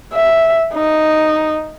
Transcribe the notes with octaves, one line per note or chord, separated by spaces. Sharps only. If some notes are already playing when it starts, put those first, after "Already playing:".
E5
D#4